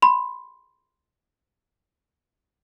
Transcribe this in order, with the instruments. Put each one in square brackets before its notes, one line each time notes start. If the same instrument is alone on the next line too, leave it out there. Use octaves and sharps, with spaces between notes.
[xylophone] B5 C6